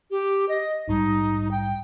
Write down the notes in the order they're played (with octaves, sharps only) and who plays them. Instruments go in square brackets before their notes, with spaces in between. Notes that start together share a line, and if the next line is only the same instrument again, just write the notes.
[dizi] G4
D#5
[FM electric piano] A#1 G#2 G3 [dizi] D#4
[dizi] G5